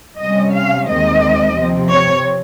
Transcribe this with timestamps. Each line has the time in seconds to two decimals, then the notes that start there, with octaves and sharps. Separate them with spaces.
0.21 C3 G3 C#4 D#5
0.55 F5
0.89 D#2 D#3 G#3 C4 D#5
1.58 C3 F3 C4
1.92 C#5